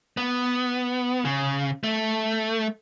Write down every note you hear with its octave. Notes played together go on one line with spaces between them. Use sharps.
B3
C#3
A3